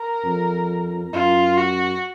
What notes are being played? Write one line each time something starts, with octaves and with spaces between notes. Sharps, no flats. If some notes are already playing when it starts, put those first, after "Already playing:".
Already playing: A#4
F2
F#2 F4
F#4